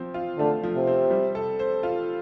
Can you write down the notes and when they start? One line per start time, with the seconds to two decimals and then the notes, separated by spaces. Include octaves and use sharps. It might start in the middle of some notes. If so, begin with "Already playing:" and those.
Already playing: F3 C4
0.14 F4
0.38 D3 A3
0.63 F3
0.75 C3
0.87 C4
1.11 G3
1.35 A4
1.59 C5
1.83 F4